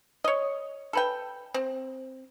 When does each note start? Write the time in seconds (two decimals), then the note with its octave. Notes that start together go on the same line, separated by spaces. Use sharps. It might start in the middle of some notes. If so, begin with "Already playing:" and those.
0.24 C#5 D#5
0.93 A4 B4 G5
1.54 C4